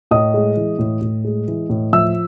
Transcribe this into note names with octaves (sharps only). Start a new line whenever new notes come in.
A2 D#5 D#6
G#3
E3
A2
A2
G#3
E3
A2
F3 E5 E6